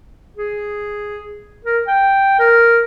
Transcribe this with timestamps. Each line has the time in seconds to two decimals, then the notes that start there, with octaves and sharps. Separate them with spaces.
0.36 G#4
1.65 A#4
1.87 G5
2.39 A#4